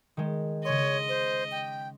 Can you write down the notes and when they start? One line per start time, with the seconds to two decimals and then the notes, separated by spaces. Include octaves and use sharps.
0.17 D#3 G#3
0.65 C#3 C#5 D#5 C6
1.09 C5
1.51 G5